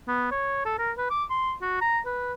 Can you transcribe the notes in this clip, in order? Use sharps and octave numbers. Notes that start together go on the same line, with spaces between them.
B3
C#5
A4
A#4
B4
D6
C6
F#4
A#5
B4